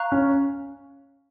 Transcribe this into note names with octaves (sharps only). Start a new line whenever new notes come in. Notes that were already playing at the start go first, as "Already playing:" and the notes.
Already playing: F5 A#5 C#6 F#6
C#4